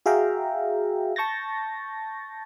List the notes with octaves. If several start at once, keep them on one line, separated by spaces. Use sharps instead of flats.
F#4 G#4 E5 F5 G5 A#5
A5 C#6 G6 A6 A#6